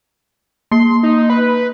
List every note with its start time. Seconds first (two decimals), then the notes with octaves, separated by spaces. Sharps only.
0.71 A#3 C6
1.03 D#4
1.30 B4